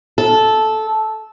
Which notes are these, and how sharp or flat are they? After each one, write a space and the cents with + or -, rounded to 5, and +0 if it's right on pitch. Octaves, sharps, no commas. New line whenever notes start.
A4 -10